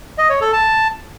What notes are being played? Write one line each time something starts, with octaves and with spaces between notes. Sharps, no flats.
D#5
C#5
A4
A5